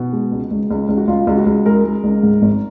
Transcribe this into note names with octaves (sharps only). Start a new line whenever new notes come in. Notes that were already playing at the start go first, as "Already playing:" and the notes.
Already playing: B2
G#3
C#2
C#2
C#2
C#2
F#4
C#2 F4
C#2
F#4
C#2
G#3 A#4
G#3
C#2
G#2
G#1